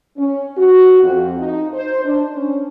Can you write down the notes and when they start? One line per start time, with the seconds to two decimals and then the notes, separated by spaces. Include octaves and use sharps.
0.17 C#4
0.57 F#4
1.03 F2
1.39 D#4
1.73 C5
2.05 D4
2.35 C#4